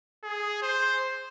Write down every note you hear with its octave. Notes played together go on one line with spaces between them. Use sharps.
G#4
C5